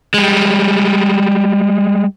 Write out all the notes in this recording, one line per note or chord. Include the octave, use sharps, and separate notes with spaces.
G3 G#3